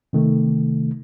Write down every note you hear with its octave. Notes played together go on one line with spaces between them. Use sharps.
C3 D#3 A3